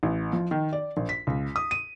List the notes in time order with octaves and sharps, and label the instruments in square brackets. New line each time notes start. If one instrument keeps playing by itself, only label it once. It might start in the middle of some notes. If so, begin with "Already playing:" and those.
[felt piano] A1
F3
D#3
D5
A#1
B6
C#2
D#6
D#7